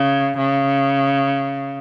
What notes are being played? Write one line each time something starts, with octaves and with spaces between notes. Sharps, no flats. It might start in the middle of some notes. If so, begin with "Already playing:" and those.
Already playing: C#3
C#3